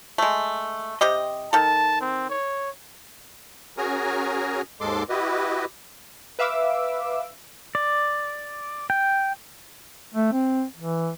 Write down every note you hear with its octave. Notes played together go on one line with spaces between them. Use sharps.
G#3 A3
C3 G4 D#5
D#3 A4 A5
C4
C#5
C#4 F#4 G#4 A#4 G#5 A#5
D#2 G#2 G#3 A4 C6 D6
E4 F#4 G4 B4 D#5
B4 E5 F5 D6 E6
D5
G5
A3
C4
E3